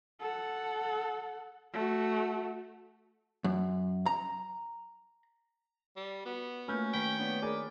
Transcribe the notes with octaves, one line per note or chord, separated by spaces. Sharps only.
A4 F#5
A3 F#4
F#2
A#5
G3
B3 F#4
A3 A#3 C#4 B4 F6 G6
D#3 B4 C#5 G5 B6
B3 D4
G#4 A#4 B4 D5 G#5